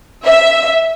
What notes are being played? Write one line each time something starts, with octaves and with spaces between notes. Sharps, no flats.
E5